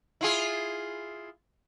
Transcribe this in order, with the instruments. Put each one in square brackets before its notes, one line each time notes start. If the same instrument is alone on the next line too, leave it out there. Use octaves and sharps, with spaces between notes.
[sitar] E4 F4 G#4